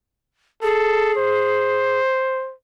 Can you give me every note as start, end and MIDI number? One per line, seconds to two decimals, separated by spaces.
0.63 2.00 68
0.63 1.13 69
1.17 2.54 72